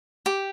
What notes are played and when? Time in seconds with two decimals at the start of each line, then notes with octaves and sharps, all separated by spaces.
0.26 G4